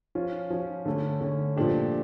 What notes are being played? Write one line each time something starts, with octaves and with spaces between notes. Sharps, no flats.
F3 C#4 F4
F3 C#4 F4
D3 A3 C#4
D3 A3 C#4
A#2 F3 A3 D4 G4